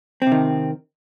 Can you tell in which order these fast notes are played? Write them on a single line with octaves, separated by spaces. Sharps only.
C4 C3 D#3